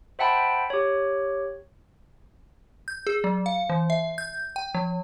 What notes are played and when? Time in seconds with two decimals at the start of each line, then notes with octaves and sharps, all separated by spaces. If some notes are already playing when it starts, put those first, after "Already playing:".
0.19 C5 E5 F#5 G5 A5 B5
0.70 G4 C#5
2.88 G6
3.07 G#4
3.24 F#3
3.46 F5
3.70 E3
3.90 E5
4.18 G6
4.56 G5
4.75 F3